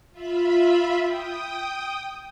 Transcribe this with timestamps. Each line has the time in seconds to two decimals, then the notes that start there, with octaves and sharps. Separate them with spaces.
0.11 F4 E5 B5
1.01 G5 D#6